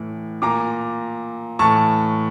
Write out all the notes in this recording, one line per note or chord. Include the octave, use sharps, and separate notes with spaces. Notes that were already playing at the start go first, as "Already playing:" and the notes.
Already playing: A2 E3
A#2 A#5 D6
A2 E3 A5 C#6